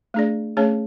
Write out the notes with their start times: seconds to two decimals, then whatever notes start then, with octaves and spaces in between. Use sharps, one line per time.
0.14 A3 D4 G#4 D5
0.57 A3 C#4 G#4 C#5